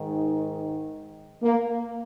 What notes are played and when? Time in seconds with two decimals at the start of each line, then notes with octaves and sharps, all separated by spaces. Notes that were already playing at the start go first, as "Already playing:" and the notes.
Already playing: G#2 D#3
1.43 A#3